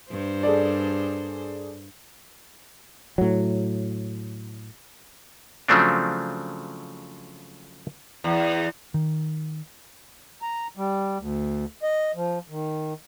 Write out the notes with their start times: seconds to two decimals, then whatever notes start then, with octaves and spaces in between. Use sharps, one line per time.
0.11 G2 C5
0.43 G#4 A4 D5
3.18 A2 F#3
5.68 C#3 F3 F#3 A3 C4 D4
8.24 E2
8.94 D#3
10.42 A#5
10.77 G3
11.19 D2
11.83 D#5
12.15 F3
12.49 D#3